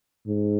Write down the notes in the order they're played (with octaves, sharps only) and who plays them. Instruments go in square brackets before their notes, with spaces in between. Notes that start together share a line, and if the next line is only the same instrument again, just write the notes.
[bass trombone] G#2